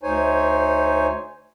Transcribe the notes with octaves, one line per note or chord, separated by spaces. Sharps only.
D2 D#4 C5 C#5 G#5